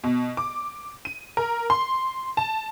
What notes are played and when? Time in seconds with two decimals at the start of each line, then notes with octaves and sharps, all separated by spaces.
0.04 B2
0.37 D6
1.05 D#7
1.37 A#4
1.70 C6
2.37 A5